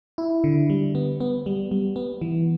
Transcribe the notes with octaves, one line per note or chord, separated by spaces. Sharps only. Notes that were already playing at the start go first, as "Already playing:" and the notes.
E4
D3
G3
B3
B3
G3
G3
B3
E3